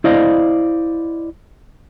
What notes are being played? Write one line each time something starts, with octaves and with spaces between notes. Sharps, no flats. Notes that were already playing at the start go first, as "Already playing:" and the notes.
E4 C5 D5 D#5 F5